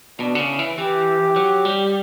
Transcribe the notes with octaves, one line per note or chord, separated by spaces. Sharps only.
B2 D4
D3
C#3
E4
E3
E3 G4
F#3
G3